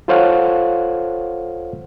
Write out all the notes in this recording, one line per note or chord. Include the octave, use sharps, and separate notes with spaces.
F4 A4 C5 C#5 F5 F#5